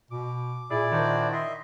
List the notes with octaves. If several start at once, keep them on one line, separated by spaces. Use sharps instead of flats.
B2 D6
A#2 E4 G#4 D5
D#3 D4 F#4 C5
D#5 E5 C6